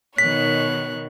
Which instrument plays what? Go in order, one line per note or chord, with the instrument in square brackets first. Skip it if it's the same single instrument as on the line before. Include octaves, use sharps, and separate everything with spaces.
[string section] B2 D#3 [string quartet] C#5 F#6 [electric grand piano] B6